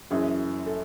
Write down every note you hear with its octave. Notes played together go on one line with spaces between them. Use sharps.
F#1 F#2 E3 G#4
A4